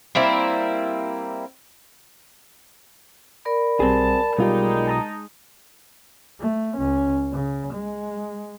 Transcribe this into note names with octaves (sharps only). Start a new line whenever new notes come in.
G3 A#3 C4 E4
A#4 D5 B5
B1 G3 C4 G#4 A5
B1 G3 G#3 D#4 F4 G4
A5 A#5 D#6
A3
C#2 C#4
C#3
G#3